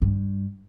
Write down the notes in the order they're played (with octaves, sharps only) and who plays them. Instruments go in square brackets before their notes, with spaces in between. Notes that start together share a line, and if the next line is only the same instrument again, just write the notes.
[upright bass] G2